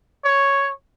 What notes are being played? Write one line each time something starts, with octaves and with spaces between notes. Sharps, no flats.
C#5